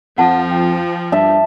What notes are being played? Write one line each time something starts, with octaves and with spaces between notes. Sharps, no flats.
F2 F3 F#5 A5
G5
G2 E5 A5